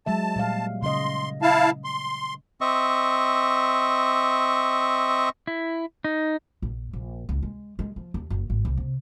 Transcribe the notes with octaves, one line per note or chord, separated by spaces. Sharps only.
F#3 G#3 E5 A5
A#2 G3 F5
C#3 C#4 D#5 C6
E4 F5 A5
C6
C4 D#5 E5 C#6
E4
D#4
A#1
A#1
C#2
G#3
G#3
F3
D#2
F#1
G#1
C2
C3